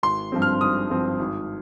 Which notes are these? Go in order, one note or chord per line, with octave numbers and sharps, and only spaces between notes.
G#1 C6
G2 F3 C4
F6
G#1 D#6
G2 F3 C4
G#1